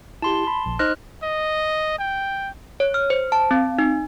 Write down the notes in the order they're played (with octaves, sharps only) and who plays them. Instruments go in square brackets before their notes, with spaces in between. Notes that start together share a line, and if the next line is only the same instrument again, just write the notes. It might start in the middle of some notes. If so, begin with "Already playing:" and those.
[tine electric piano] E4 G4 [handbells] A5 C6
[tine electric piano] B5
A#1
[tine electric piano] D#4 C5 C6 [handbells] D#5 F6 F#6
[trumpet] D#5
G5
[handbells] C#5
F6
C5
A5
C4
D#4